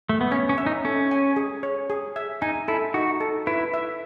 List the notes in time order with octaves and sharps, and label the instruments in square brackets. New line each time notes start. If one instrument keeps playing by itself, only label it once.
[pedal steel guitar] A3
B3
[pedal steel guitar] C#4 [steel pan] C#5
[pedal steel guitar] C#4
[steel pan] E5
[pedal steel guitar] D#4
[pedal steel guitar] C#4 [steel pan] A4
[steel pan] G#5
G#4
C#5
G#4
E5
[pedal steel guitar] D#4 [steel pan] G#5
[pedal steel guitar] E4 [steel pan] A4
[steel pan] D#4 [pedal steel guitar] F#4
[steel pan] A4
[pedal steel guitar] E4 [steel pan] B4
[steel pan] E5